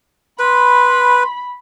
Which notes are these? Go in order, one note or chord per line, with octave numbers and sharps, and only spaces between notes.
B4 B5 C6